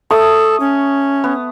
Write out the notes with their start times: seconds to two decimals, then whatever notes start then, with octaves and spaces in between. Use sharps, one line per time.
0.11 A3 A4 C#6 D#6
0.60 C#4
1.24 B3